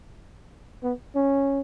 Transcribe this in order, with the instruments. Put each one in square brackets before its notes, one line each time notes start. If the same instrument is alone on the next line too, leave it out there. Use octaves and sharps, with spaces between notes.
[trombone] B3
C#4